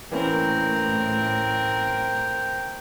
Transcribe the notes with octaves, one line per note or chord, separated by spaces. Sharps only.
A2 E3 A#3 C4 C#4 A#4 G5